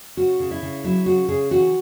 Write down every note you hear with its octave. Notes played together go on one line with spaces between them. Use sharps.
C#3 F#4
C#3
E4
C#3
F#3 E4
C#3 F#4
C#3 G#4
E3 F#4